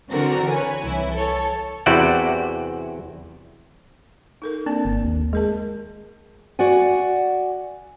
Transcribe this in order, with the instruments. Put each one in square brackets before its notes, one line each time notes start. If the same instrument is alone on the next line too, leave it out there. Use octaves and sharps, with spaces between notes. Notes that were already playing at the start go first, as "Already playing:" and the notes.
[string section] D3 E3 C4 F#4 A#4
B4 C#5 G#5
C2 E3 E4
A4 C#5
[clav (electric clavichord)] E2 C3 E4 F#4 D5 G5
[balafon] D#4 A4 A#4
[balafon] A#3 C4 A5 [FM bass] D4
[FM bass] G1
D#2
[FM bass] G#3 [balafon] G#4 A#4 A5
[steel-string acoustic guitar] F#4 D5 F#5 G#5